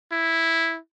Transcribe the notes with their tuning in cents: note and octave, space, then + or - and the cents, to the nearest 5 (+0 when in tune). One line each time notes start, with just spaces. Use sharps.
E4 -5